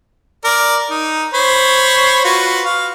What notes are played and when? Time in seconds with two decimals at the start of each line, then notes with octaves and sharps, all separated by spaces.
0.44 A#4 D5
0.90 D#4
1.34 C5 C#5 B5
2.24 F4 F#4 B4
2.65 F5